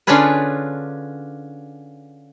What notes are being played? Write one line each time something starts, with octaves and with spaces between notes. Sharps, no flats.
D3 C#4 D4 F4 G#4 B4